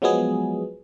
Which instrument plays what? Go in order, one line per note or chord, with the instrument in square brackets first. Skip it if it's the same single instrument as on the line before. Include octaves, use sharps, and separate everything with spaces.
[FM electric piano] F3 F#3 G#3 B3 G#4